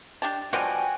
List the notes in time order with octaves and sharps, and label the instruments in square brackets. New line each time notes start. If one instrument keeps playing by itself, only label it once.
[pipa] D4 G4 A5
[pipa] B2 F3 G3 [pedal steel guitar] F#4 G5 G#5